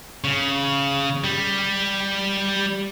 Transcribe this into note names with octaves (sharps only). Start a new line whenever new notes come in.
C#3
G3